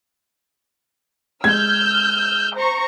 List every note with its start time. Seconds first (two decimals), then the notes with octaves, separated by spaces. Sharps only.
1.44 G#3 E6 F6 G6 G#6
2.55 C5 A#5 C#6